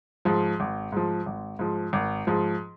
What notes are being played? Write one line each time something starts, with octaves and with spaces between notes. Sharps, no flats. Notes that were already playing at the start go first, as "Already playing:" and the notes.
G#2 F3
G#1
G#2 F3
G#1
G#2 F3
G#1
G#2 F3